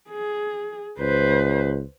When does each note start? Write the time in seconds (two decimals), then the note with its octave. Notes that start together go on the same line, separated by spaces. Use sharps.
0.10 G#4
0.99 C#2 B4 C5